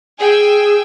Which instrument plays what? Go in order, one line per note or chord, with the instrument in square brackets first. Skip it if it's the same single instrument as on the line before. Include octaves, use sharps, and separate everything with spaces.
[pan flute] G#4 [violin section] G5 G#5 E6